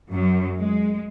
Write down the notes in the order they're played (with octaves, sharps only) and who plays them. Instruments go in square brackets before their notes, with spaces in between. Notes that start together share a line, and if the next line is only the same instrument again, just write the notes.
[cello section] F#2 F#3
G#3